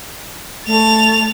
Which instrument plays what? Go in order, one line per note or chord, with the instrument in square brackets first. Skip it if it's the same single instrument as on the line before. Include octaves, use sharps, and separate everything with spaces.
[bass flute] A3 [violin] A6 F7